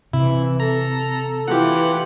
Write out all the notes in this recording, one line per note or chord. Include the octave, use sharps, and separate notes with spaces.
C3 E3 E4
A4 A#5
E3 F4 G4 F#5